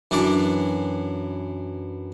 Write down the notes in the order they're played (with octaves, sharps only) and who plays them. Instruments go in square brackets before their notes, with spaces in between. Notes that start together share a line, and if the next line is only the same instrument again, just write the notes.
[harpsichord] F#2 E3 D4